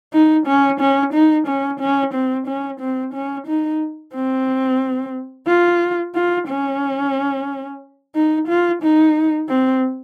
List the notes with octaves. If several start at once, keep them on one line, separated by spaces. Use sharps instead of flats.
D#4
C#4
C#4
D#4
C#4
C#4
C4
C#4
C4
C#4
D#4
C4
F4
F4
C#4
D#4
F4
D#4
C4